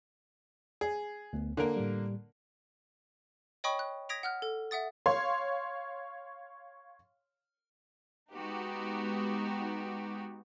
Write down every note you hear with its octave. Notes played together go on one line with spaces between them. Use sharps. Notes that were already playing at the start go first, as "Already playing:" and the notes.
G#4
D2 A3 B3
D3 A#3 A#4 G#5
A2 G3
C#5 D#5 G5 B5 C#6 D#6
F#6
D#6 G#6 A#6 B6 D7 F7
F#5 F6 F#6
A4
E5 F#5 D#6 A6
C#5 F5 C6
G#3 B3 D#4 F#4 G4